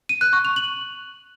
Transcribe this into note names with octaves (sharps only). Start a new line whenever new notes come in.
D#7
F#6
C#6
F7
F#7